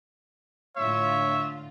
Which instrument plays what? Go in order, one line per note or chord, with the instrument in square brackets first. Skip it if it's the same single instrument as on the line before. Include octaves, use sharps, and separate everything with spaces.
[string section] A2 D3 F4 [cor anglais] C#5 [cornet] E5